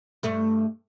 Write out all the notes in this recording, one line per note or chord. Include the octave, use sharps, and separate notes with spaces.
G2 A3